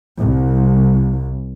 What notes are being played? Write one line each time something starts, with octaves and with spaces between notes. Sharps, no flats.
C2